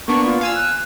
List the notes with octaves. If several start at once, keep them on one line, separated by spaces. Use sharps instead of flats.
A#3 B3 D4 C#6
F4
F5 G#5 E6
F#6